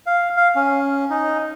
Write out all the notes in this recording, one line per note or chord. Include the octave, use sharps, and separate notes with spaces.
F5
F5
C#4
D#4